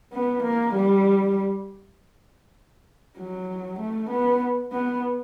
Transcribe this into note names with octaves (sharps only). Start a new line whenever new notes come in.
B3
A#3
G3
F#3
A3
B3
B3